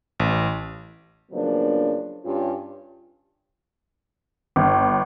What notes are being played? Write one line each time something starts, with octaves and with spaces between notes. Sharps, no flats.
A1
C#3 F3 F#3 A#3 B3 D4
G2 C#4 F4 G4
G1